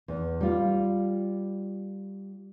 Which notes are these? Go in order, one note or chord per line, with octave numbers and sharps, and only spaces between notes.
E2
G3 F4